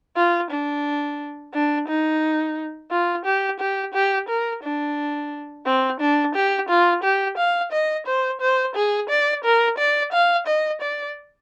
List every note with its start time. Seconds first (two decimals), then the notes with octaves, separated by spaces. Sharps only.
0.16 F4
0.51 D4
1.54 D4
1.88 D#4
2.91 F4
3.25 G4
3.60 G4
3.94 G4
4.29 A#4
4.63 D4
5.66 C4
6.00 D4
6.35 G4
6.69 F4
7.03 G4
7.37 F5
7.72 D#5
8.06 C5
8.41 C5
8.75 G#4
9.09 D5
9.44 A#4
9.78 D5
10.12 F5
10.47 D#5
10.81 D5